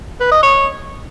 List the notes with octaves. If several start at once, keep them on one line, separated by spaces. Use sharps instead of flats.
B4
D#5
C#5